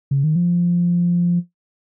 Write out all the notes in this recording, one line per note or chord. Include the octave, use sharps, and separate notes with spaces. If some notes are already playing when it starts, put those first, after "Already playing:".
C#3
D#3
F3